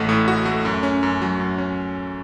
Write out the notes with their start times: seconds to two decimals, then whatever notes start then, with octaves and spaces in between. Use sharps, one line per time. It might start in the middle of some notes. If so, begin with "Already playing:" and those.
Already playing: A1 A3 F#4
0.09 A2
0.28 F#4
0.45 A3
0.65 F#2
0.83 C#4
1.03 F#2
1.22 F#3
1.40 F#2
1.58 C#4